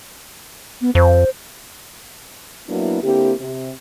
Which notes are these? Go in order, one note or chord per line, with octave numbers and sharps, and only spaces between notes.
B3
F2 C5
F#3 A#3 B3 D4 E4
D3 A#3 C4 E4 G4
C3